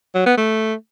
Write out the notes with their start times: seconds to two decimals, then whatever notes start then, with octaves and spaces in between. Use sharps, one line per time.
0.15 F#3
0.26 B3
0.38 A3